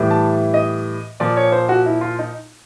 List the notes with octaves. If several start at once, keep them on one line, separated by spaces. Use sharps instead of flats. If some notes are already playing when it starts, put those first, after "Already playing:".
Already playing: A2 E3 G3
A5
D#5
A#2 F3 D5
C#5
C5
F#4
E4
F4
D#4